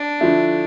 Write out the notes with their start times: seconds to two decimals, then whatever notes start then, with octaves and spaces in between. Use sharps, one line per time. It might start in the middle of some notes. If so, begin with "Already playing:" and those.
Already playing: D4
0.20 D3 F3 A3 E4